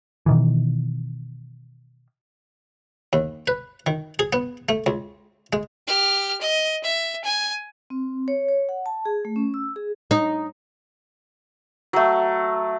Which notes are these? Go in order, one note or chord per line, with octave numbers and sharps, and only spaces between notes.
B2 D#3 E3
D#2
B4
D#3
G#4
B3
A3
C#2
G#3
G4 F6
D#5
E5
G#5
C4
C#5
C#5
F#5
A5
G#4
A3
C#4
E6
G#4
D#4
F#3 A3